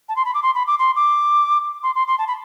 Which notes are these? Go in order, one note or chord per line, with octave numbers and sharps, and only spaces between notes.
A5
C6
B5
D6
C6
B5
D6
C6
D6
C6
C6
C6
A5
B5